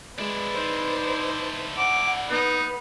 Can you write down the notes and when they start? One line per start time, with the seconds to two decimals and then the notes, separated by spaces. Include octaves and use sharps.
0.18 G#3 D4 E4 B4
0.53 D#4 C5
1.78 F#5 D6
2.30 B3 D#4 B4